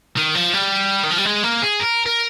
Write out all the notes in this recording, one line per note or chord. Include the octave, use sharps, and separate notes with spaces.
D#3
F3
G3
D#3
F3
G3
G#3
A#3
G#4
A#4
A#4